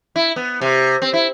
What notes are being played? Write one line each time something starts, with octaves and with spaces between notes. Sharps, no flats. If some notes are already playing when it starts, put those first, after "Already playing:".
E4
B3
C3
C4
E4